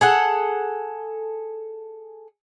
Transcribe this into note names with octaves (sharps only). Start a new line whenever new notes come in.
G#4 A4 F#5